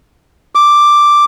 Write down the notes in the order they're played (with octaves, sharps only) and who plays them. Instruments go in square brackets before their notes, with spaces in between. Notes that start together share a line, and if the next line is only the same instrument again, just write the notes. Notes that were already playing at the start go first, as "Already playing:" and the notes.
[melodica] D6